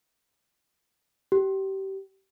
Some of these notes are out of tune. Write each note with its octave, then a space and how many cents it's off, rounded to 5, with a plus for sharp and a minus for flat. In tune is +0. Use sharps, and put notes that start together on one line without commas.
G4 -25